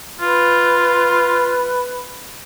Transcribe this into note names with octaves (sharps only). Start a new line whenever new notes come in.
F4 B4